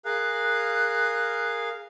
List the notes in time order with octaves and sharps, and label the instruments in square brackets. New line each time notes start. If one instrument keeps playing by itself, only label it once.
[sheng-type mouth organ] G#4 A#4 F5 [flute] F#6